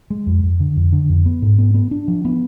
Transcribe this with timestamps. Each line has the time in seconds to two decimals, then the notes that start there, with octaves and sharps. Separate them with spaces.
0.10 G#3
0.26 F2
0.44 F2
0.60 D3
0.77 F2
0.93 D3
1.10 F2
1.26 B3
1.42 G#2
1.58 B3
1.74 B3
1.91 D4
2.08 F3
2.25 B3